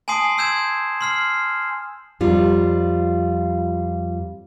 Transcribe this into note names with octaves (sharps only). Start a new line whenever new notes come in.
G#5 A5 C6 D#6 C7
C6 E6 G6 G#6 E7
C6 F6 C7
F2 G3 F4